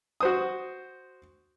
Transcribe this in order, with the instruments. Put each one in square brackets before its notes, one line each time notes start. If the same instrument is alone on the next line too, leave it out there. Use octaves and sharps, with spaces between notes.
[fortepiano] F#4 C5 D#6